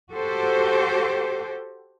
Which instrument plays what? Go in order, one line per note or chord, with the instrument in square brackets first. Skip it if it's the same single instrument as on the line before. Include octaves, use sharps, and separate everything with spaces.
[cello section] F#4 G4 A4 C5